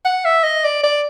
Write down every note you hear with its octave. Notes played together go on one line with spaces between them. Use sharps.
F#5
E5
D#5
D5
D5